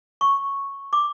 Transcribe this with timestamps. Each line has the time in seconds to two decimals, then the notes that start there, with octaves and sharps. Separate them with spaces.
0.21 C#6
0.93 D6